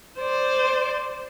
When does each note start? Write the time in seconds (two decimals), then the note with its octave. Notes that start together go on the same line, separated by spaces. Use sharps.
0.20 C5 D5